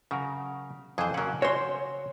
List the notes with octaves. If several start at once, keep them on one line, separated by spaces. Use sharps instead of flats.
C#3 F#3 A#4
F2 E3 G#4 C5
C#3 F#3 A#3 C#4 F#5
C#4 F#4 C5 C#5 C6